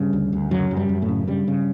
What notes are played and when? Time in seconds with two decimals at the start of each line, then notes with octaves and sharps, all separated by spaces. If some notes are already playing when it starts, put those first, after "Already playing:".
Already playing: G2 C#3 G3
0.13 D2
0.32 D2
0.51 F#2 C#3 F#3
0.71 F#2
0.77 G2 G3
0.89 F#2
1.02 A2 A3
1.09 C#3
1.27 G2 C#3 G3
1.48 C#3